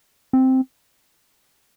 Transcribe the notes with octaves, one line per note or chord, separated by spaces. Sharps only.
C4